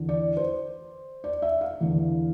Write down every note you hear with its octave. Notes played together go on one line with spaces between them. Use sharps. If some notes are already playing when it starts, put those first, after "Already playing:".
Already playing: E2 D3
D5
C5
D5
E5
F5
E2 D3